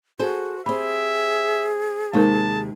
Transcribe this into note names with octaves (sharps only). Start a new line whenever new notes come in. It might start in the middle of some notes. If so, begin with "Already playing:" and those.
F#4 G#4 A4 C5
C4 G4 G#4 E5 B5
D#2 C3 G#3 D#4 A#4 A5